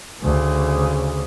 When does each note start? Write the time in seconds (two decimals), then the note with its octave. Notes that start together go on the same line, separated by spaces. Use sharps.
0.21 D2 C#3